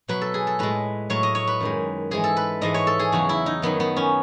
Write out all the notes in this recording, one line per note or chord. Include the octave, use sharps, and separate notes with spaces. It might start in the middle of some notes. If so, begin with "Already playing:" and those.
B2 F#3 B4
A4
G#4
A4
A2 G#3 B4
A2 F#3 C#5
D#5
C#5
B4
F#2 D#3 G#3
G#2 E3 G#3 G#4
A4
B4
G#2 E3 G#3 D#5
C#5
A4
G#4
E2 C#3 F#3 F#4
E4
D#4
F#2 D#3 F#3 B3
B3
C#4